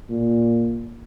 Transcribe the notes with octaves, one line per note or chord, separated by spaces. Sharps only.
A#2